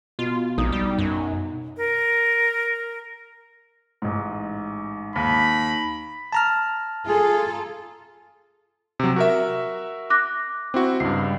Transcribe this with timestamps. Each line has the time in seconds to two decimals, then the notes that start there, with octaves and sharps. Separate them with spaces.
0.19 B2 F4
0.58 A#1 D#4
0.72 G3
0.98 F#2
1.77 A#4
4.02 A1 G#2
5.16 D#2 B5
6.33 A5 A#5 F6
7.07 F4 G#4 A4
9.00 C3 F#3
9.16 F#4 A#4 E5
10.10 D6 F#6 A#6
10.74 C4 E4 F#4
11.00 C#2 G2 C7